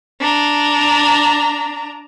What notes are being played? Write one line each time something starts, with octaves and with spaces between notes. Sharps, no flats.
D4 A#5